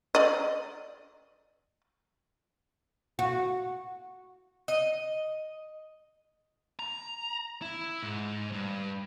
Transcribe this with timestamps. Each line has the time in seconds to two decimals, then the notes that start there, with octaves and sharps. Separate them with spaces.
0.15 D5 D#5
3.19 F#4
4.68 D#5
6.79 A#5
7.62 E4
8.03 G#2
8.52 G2